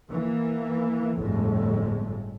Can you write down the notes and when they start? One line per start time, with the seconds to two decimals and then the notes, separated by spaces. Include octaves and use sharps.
0.11 E3 A#3 B3
1.17 G1 F2 A2 G#3 A3